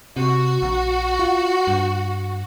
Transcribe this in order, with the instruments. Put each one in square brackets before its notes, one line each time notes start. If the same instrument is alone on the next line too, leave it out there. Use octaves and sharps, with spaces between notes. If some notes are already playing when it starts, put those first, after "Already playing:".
[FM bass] C3 [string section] F#4
[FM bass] A#1
F4
G2